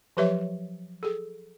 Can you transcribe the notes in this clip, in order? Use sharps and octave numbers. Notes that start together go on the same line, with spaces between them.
F3 F#3 G4 B4 C#5 E5
G#4 A4